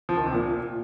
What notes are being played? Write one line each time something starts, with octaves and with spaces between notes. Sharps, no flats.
F3
D#3
C3
A#2